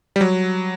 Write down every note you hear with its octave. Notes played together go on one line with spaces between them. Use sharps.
G3
F#3